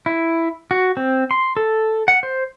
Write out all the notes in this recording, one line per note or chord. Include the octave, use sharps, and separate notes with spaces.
E4
F#4
C4
C6
A4
F#5
C5